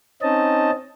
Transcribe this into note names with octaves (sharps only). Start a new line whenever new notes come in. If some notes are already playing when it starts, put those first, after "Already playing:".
C4 C#4 D#4 D#5 A5